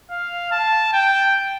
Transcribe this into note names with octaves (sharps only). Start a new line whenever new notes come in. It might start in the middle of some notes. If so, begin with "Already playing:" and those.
F5
A5
G5